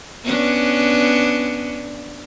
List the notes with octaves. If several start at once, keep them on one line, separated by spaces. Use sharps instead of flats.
B3 C#4 D4